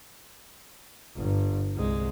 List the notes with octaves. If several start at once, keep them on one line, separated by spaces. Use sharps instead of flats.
G1 G2
C2 G#3